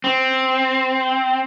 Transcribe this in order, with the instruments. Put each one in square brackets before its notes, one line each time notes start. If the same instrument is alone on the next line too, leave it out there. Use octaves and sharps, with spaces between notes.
[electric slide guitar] C4